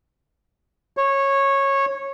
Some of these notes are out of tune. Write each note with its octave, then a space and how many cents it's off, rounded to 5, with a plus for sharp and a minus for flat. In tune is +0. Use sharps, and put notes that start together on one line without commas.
C#5 -15